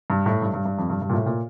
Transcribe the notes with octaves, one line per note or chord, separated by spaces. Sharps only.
G2
A2
G2
G2
G2
F2
G2
G2
A#2
A2
A#2